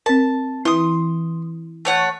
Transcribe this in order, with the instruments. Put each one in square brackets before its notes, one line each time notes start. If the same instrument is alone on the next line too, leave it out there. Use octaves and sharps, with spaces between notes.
[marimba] C4 A#4 [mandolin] A5
[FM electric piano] E3 [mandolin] C6 D#6
[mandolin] A3 C#5 F#5